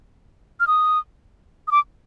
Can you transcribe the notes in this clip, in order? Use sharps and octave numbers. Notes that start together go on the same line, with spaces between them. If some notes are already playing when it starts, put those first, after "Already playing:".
F6
D#6
D#6
D6